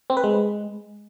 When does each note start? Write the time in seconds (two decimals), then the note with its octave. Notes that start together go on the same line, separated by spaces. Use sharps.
0.10 C4
0.17 B4
0.24 G#3